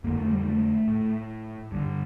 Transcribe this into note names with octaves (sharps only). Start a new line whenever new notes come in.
F2 D3 A#3
A3
G3
A3
A2
G2 D3